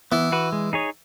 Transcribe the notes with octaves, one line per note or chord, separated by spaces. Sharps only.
E3 B3
F#4 B4
G#3
D#4 G#4 C#5